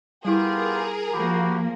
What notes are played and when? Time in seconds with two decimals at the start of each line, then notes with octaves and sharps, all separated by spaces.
0.25 G3 B3 E4 F4 G4 G#4 A#4
1.13 F3 A#3 F#4 G4 B5